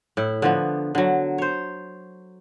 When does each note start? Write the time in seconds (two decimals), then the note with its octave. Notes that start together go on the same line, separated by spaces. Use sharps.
0.17 A2 E4
0.42 D3 F3 B3
0.95 D3 F#3
1.38 C5 C#5